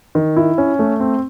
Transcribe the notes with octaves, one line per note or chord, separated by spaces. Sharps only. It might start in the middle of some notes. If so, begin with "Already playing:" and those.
D#3
E4
C#4
A3
C4